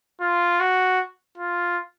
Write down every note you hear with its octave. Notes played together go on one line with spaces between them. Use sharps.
F4
F#4
F4